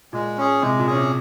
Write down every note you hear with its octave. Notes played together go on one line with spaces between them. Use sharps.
A#2 G#3
C#4 G#4
C3 G#3
A#2
C#4 G#4
C3